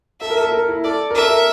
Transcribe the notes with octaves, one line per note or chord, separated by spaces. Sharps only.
A4 E5
A#4
A4
A#4
E4
A4 D5
A#4
A4 E5
A#4